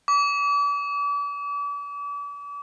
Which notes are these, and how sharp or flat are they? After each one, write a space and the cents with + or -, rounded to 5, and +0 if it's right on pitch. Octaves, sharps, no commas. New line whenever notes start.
D6 -40